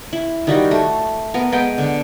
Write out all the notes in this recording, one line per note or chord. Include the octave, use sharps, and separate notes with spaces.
E4
D#3 G3 F#4
A3
B3 A#4
G#3 B3 G5
D3